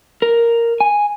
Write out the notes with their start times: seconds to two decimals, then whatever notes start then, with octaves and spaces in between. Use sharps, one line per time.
0.22 A#4
0.80 G#5